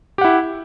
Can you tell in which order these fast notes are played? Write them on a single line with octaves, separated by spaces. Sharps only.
G4 F#5 E4